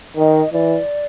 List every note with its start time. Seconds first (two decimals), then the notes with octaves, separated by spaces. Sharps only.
0.17 D#3 D#5
0.53 E3 D5